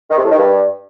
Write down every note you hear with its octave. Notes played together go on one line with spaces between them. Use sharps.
D#3
C3
A2
D#3
G2